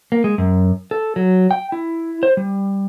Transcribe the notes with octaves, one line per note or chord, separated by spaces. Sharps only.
A#3
G#3
F#2
A4
F#3
G5
E4
C5
G3